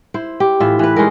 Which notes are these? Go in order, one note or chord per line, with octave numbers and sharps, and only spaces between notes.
E4 C5
G4
A2 E3 F4 E5
E3 B4
G#3 C#4 D#4 A#4